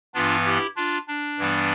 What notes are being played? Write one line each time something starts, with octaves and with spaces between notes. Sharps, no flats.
G2 E3 B3 D4 F4
E4 G4
D4 F4
D4
G2 E3 G3 B3